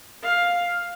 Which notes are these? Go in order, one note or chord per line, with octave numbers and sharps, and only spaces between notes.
F5